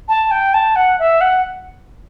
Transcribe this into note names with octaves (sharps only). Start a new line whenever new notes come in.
A5
G5
A5
F#5
E5
F#5